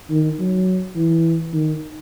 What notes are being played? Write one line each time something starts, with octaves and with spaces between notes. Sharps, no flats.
D#3
F#3
E3
D#3